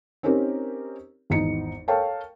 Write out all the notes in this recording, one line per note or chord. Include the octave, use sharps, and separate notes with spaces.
C4 C#4 D#4 G4 A#4
G#1 E2 D#4 C#7
A4 A#4 C#5 F5 G5 A5